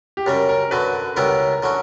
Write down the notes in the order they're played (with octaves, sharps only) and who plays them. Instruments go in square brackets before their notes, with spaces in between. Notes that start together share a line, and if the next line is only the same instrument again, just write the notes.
[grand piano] G4
[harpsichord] F#2 C#3 G3 [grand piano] A#4
[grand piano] A#4
[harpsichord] F#2 D3 F#3 [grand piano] B4
[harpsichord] C#2 C#3 G3 B3 E4 [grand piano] A#4
[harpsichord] D3 F#3 C#4